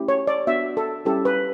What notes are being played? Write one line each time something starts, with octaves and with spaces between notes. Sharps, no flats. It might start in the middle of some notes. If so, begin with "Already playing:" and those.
Already playing: A3 C#4 E4 G4
C#5
D5
B3 D4 F#4 E5
A4
G3 C#4 E4 G4 A4
B4